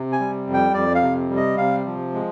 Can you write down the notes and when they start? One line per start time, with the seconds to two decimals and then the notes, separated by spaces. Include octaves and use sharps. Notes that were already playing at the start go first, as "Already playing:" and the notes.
Already playing: C3
0.12 G#5
0.20 G3
0.47 F2
0.54 G5
0.74 F2 D5
0.95 F5
1.02 C3
1.30 G3
1.37 D#5
1.57 C3 F5
1.86 F3
2.14 G#3